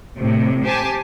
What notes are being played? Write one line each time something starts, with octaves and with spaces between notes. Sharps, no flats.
A2 C3
G4 C5 G#5 A5